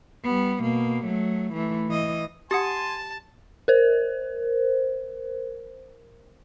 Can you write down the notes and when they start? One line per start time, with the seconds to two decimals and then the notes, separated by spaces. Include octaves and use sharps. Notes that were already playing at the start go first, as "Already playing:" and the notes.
0.24 G3 B3
0.62 B2 A#3
1.05 F#3 A3
1.53 E3 A3
1.88 E3 D#5
2.51 G4 F#5 G#5 A5 C6 D#6 A6
3.68 A#4 C5